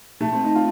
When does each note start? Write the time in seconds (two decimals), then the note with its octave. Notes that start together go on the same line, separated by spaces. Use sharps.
0.21 A3
0.32 C4
0.44 D#4
0.55 F4